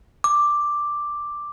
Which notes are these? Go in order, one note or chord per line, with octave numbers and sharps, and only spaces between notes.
D6